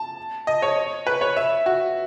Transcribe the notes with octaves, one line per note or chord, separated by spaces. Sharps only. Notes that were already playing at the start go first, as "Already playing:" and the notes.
Already playing: A5
D#5
C#5
B4
C#5
E5
F#4